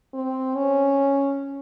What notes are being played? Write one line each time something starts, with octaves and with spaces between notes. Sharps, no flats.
C4
C#4